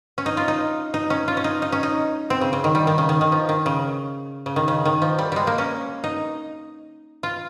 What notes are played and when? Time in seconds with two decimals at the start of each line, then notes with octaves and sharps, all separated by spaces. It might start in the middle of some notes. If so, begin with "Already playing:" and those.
0.18 C#4
0.26 D#4
0.37 F4
0.48 D#4
0.94 D#4
1.10 C#4
1.28 F4
1.37 C#4
1.44 D#4
1.62 D#4
1.72 C#4
1.83 D#4
2.30 C4
2.41 C#3
2.53 C#3
2.64 D#3
2.75 G3
2.87 D#3
2.98 C#3
3.09 D#3
3.21 D#3
3.32 F3
3.49 D#3
3.66 C#3
4.46 C#3
4.56 D#3
4.68 C#3
4.85 D#3
5.02 F3
5.19 G3
5.32 G3 G#3
5.47 A#3
5.58 C#4
6.04 D#4
7.23 F4